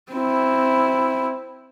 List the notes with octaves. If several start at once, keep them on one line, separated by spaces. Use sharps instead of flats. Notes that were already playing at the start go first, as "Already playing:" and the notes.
C4 E4